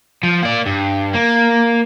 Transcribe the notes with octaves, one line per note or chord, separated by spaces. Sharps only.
F3
A#3 D5
G2
A#3